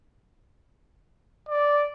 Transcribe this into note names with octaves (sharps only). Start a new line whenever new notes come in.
D5